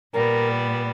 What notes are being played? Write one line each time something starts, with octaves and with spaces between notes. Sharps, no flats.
A#2 G3 B3 A#4